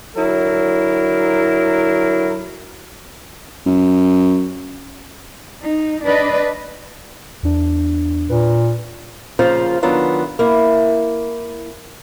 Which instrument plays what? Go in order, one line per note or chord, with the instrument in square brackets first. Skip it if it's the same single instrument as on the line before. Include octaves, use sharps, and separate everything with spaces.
[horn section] D3 F#3 E4 A#4
[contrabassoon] F#2
[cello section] D#4
D4 B4 D5 D#5
[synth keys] E2 D4
[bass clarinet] A#2 [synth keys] B4
[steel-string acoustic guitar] A#2 C#3 F3 F4 C5
D#3 F#3 B3 D4 F4
A#3 E4